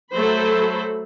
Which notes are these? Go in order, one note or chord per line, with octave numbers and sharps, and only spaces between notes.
F#3 A3 A4 C5 B5